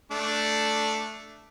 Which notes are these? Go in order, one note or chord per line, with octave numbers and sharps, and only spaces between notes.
A3 D4